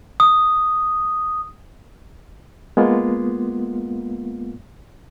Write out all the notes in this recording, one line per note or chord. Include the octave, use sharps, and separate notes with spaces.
D#6
G#3 A#3 B3 F4